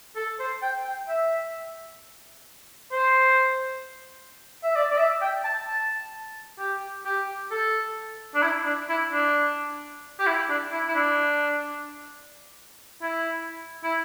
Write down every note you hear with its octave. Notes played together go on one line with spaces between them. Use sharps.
A4
C5
G5
G5
E5
C5
E5
D5
D5
E5
G5
A5
A5
G4
G4
A4
D4
E4
D4
E4
D4
G4
E4
D4
E4
E4
D4
E4
E4